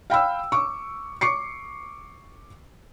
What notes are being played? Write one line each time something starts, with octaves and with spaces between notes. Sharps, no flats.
F5 G5 B5 E6
C#6 D6
C#6 D6 C7 C#7